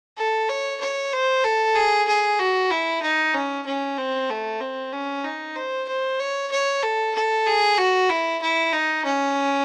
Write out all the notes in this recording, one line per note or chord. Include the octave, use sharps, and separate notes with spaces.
A4
C#5
C#5
C5
A4
G#4
G#4
F#4
E4
D#4
C#4
C#4
C4
A3
C4
C#4
D#4
C5
C5
C#5
C#5
A4
A4
G#4
F#4
E4
E4
D#4
C#4